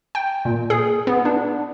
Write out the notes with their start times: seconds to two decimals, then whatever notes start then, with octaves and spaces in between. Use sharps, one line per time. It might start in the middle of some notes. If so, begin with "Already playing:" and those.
0.15 G5
0.45 A#2
0.70 G#4
1.07 B3
1.25 D4